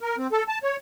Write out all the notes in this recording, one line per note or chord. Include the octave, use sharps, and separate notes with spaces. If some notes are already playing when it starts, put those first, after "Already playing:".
A#4
C4
A4
A5
C#5